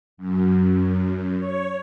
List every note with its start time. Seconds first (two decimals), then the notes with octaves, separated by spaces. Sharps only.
0.17 F#2
1.37 C#5